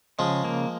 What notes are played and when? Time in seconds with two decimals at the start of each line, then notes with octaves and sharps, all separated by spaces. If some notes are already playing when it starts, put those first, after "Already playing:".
0.19 C#3 F3 G#3
0.45 A#3